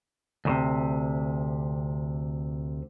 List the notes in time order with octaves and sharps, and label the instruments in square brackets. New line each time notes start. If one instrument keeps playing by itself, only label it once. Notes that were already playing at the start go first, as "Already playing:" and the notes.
[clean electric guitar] D2 A2 C3